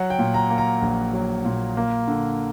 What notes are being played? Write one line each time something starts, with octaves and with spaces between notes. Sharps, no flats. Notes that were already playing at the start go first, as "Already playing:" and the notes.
Already playing: F#3 F#5
G5
A#2
A#5
A#3
A#5
A#1
F#3
A#2
A#3
D3